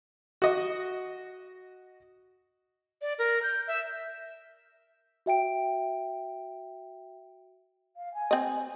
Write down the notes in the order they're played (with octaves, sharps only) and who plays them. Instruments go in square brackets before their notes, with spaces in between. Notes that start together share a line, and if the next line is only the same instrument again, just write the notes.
[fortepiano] F#4 D#5
[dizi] D5
A#4
G6
E5
[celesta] F#4 E5 G5 D7
[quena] F5
G#5
[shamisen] C4 D#5